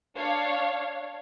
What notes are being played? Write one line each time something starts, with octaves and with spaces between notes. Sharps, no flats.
D4 C#5 F5